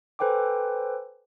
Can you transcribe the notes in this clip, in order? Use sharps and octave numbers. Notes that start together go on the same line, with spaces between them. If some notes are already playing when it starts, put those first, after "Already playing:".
A4 B4 C5 G5 G#5 D6